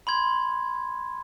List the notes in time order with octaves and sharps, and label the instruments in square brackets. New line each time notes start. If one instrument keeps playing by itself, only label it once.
[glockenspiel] B5 C6 G#6